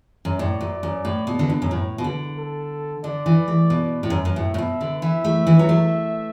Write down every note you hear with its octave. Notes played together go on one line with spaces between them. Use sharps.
F#2
A2 D5
F#2
F#2
A2
B2
D3
B2
F#2
A2
B2
D3
A4
D3 D5
E3
A3
B2
A2
F#2
F#2
A2 E5
A2
B2
D3
E3 E5
A3
E3
F#3
A3